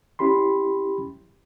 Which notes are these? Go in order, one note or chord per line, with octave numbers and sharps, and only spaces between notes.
C#4 E4 G4 B5 C6